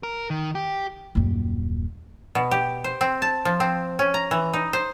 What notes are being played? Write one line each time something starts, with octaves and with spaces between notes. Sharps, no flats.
A#4
D#3
G4
D#1 F#2
B2
G4
C5
C4
A5
F3
C4
C#4
A#5
E3
D#4
C5